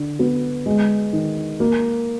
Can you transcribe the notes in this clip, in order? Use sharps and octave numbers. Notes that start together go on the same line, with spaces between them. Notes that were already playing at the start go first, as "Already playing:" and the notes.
Already playing: D3
B3
G#3
D#3
A#3